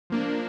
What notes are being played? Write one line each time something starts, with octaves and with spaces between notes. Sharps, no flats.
F3 A#3 D4